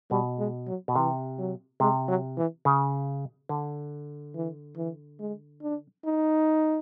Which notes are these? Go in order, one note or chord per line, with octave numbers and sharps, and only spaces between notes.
B2 G3
G#3
F#3
B2
C3 E3
F#3
C3 G#3
F#3
E3
C#3
D3
E3
E3
G#3
D4
D#4